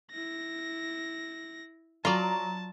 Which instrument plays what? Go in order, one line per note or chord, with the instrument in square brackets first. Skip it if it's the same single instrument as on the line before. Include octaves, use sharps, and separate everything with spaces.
[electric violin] E4 A#6
[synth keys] F#3 A#5 [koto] F4 D5 [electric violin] A5